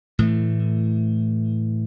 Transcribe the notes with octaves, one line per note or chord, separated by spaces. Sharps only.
A2 E3 A3